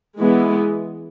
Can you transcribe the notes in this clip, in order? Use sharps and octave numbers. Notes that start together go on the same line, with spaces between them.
E3 G#3 B3